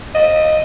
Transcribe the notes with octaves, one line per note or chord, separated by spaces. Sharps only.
D#5